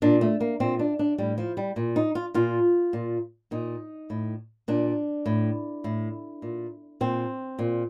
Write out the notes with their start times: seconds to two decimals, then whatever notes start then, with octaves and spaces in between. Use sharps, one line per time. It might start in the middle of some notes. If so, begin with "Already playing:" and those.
0.02 A#2 D4
0.21 A3
0.40 A#3
0.60 A#2 C4
0.79 D4
0.99 D4
1.18 A2 G3
1.38 F3
1.57 G3
1.76 A#2
1.96 D#4
2.15 F4
2.34 A#2 F4
2.93 A#2
3.51 A#2 D#4
4.10 A2
4.68 A#2 D4
5.26 A2
5.84 A2
6.42 A#2
7.01 A#2 C4
7.59 A#2